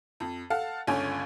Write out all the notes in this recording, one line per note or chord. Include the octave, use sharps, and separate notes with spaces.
F2
A4 F5 F#5 A5
G1 C#2 D3 C#4 G#5